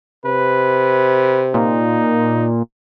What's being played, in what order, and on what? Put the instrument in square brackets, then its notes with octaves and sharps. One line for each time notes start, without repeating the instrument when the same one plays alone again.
[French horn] C3 [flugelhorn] B4
[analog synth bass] A#2 [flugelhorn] D#4